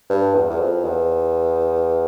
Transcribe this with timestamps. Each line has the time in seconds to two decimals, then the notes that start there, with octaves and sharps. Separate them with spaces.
0.10 G2
0.35 E2
0.50 E2
0.60 F2
0.85 E2